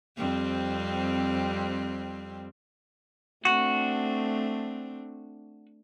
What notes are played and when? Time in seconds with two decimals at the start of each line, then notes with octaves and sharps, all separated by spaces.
0.17 F2 G3 C4
3.45 A3 C4 D4 F#4